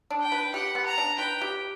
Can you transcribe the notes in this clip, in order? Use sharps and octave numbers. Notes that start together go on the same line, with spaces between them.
D4
G5
B4
G4 F#5
B3
A#5
D4
B4 G5
G4